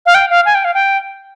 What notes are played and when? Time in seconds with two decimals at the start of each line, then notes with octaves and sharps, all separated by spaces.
0.06 F5
0.15 G5
0.30 F5
0.46 G#5
0.55 G5
0.65 F5
0.74 G5